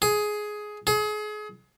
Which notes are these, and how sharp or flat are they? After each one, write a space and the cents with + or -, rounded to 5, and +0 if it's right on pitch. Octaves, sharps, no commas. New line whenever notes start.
G#4 +10
G#4 +30